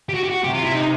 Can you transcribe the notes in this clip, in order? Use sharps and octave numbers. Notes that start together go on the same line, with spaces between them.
G4
F#4
G4
F#4
C3 G4
F4
E4
D#4